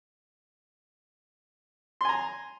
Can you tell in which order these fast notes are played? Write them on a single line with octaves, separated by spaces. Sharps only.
C6 G#5 A#5